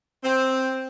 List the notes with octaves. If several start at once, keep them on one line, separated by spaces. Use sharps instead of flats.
C4